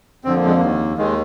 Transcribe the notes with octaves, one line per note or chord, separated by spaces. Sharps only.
F2 D3 F3 C4
A#3
G#3
A#3
D#2 D#3
D#2 D#3 G#3